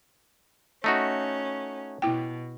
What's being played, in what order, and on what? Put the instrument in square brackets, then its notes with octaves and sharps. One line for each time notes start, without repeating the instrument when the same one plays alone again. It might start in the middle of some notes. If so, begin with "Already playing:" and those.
[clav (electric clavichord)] A3 D#4 F#4 [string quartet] C#4
[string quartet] B2 [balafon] E4 G5